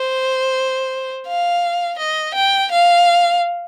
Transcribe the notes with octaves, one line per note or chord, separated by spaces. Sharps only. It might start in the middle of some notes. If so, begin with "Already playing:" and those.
Already playing: C5
F5
D#5
G5
F5